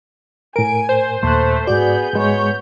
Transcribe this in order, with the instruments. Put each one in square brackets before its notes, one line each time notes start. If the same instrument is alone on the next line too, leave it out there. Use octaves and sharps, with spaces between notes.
[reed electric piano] A2 A#4 [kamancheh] G#5 [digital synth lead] D7
[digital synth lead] C5
[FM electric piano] D#2 A#2 [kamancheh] A3 [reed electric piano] C6 F#6
[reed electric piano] G#2 D5 [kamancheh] B3 G#4 [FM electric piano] F#4 [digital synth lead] G6
[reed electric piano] G#2 G#3 [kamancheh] B3 C#5